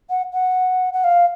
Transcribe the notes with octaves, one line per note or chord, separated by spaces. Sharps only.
F#5
F#5
F#5
F5